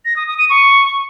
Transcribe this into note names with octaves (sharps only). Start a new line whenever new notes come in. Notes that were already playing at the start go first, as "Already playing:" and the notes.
A#6
D#6
D#6
D#7
C#6